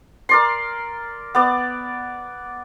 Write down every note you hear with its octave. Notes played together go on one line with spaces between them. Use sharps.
A#4 D5 C6
B3 D5